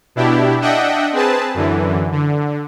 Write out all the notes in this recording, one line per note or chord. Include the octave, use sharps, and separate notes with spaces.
B2 D4 E4 G4
D4 D#5 E5 F#5 G5
C4 G#4 B4 A5
F#2 D3 E3
D3